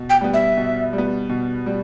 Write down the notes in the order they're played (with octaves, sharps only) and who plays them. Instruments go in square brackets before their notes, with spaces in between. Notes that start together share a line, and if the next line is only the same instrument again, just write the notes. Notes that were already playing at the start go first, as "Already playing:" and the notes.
Already playing: [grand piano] B2
[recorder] G5
[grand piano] G3 B3
[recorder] E5
[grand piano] B2
G3
B3
B2
G3